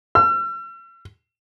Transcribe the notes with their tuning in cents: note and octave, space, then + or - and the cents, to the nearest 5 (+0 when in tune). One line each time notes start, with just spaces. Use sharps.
E6 +45